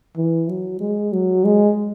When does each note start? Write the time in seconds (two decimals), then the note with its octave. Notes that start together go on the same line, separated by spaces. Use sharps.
0.16 E3
0.48 F#3
0.80 G#3
1.12 F#3
1.44 G#3